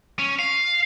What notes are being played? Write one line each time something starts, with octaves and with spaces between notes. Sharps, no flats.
C#4
F5